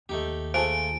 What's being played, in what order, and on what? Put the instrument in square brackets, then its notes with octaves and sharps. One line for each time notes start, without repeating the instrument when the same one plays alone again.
[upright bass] D#2 [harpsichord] A3 D#4 G4
[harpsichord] A3 F4 G#4 [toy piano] C5 G#5 A5 [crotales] D7